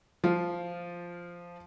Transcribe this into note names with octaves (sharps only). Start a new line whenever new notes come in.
F3 F4